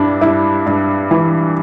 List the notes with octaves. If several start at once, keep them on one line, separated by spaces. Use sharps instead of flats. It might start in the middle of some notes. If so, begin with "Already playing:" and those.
Already playing: G2 D4 E4
G2 E4
G2
E3